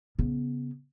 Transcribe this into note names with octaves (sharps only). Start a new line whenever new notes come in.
C#3 B3